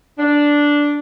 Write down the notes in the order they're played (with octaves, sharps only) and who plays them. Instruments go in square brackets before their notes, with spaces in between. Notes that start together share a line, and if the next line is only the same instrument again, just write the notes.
[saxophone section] D4